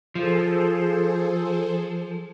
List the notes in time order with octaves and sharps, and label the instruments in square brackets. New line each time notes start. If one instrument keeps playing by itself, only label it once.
[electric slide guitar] F3 [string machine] G#4 A4 C5